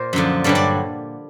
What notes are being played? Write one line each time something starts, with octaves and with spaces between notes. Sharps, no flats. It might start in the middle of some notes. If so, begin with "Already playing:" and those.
Already playing: A#2 A#4 C5
F#2 D3 F3
G2 D3 F#3 D5
D5